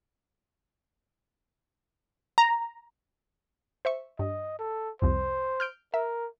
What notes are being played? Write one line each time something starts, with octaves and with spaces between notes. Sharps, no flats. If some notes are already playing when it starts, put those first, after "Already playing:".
A#5
C5 E5 C#6
G2 D#5
A4
C2 F2 C5
F6 G6 D7
A#4 E5